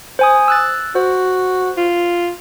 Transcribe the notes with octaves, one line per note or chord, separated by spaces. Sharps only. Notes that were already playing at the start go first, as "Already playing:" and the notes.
C5 G#5 D#6
E6 F#6 A6
F#4 C5
F4